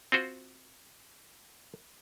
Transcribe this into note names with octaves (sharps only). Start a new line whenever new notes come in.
C4 F4 F#4 C5